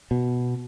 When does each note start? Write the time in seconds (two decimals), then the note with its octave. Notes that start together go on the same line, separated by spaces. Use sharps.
0.11 B2